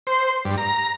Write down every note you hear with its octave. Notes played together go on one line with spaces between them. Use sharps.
C5
G2
A#5